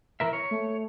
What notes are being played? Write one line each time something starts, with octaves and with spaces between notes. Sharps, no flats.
E3 A#4 E5
C#5
A3